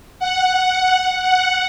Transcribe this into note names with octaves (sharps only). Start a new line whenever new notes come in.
F#5
F#5